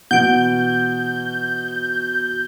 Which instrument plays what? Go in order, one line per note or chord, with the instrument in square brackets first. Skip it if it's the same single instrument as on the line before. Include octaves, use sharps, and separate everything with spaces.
[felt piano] B2 E3 [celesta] F#5 D7 [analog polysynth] G6